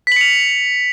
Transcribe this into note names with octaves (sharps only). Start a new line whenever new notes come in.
B6 C#7 F7 F#7